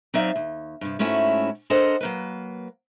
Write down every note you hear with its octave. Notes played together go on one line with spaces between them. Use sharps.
F#3 C4 D#4 D5 E5 F5
D#2
G2 C3
G#2 A3 C#4 E4 F#4
D4 A4 A#4 C5 D#5 F#5
F#3 A#3 B4